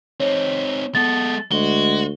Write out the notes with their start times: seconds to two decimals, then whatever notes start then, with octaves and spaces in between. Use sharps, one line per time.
0.20 C4 D#4 C#5
0.95 G#3 B3 A4 A6
1.52 D2 G#3 F#4 G7